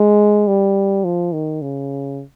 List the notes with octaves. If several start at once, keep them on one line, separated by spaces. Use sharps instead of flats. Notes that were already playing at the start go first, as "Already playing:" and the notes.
Already playing: G#3
G3
F3
D#3
C#3